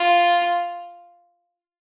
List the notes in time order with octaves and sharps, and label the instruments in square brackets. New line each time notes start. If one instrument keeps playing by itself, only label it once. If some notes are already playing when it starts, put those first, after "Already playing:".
Already playing: [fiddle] F4